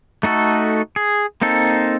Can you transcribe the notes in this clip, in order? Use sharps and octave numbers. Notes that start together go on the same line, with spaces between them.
A3 D#4 F#4 A4
G#4
A#3 C4 D#4 A4